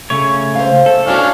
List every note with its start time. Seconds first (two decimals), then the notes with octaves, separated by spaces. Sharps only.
0.10 C#3 A3 C#5
0.55 C5 F5
0.86 A4 E5
1.07 C#4 D4 E4 F#4 F5